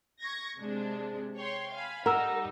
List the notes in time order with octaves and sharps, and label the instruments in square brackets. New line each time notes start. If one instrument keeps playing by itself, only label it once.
[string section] C#6 G#6 A#6
C3 G#3 D4
C#5 G5 C6
F5 G#5 B5
[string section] G3 D#4 [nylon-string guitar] A#4 [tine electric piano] F#5 A#5 E6